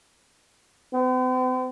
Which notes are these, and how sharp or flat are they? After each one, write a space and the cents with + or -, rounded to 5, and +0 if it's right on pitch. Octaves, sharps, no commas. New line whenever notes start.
C4 -45